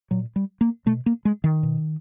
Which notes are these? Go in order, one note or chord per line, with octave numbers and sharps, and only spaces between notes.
A#2 F#3
G3
A#3
B2 A3
A#3
G#3
D#3
B2